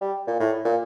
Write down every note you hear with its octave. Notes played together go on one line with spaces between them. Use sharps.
G3
A#2
A2
A#2